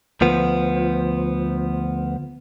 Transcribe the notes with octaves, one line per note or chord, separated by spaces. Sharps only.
D2 F3 B3